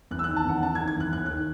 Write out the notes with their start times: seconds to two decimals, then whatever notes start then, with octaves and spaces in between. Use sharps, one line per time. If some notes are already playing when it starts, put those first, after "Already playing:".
0.11 E2 F#6
0.19 E6
0.24 D#3 F#6
0.36 A5
0.45 E2 F#5
0.63 E2 A5
0.75 G#6
0.80 D#3
0.88 G#6
0.96 E2 F#6
1.13 D#2 F#6
1.26 D#3 F#6